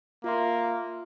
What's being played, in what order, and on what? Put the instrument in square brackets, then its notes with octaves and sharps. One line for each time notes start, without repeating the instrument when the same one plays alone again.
[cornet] A#3 [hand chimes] F4 E5 C6